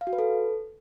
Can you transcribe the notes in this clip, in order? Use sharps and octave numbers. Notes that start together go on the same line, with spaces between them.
F5
F#4
B4
A4